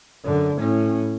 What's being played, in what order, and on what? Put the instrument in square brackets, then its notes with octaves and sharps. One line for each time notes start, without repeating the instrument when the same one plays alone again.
[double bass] F#2 D3
A2 C#4